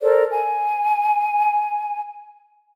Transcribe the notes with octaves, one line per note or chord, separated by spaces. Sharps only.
A4 A#4 C5 D5
G#5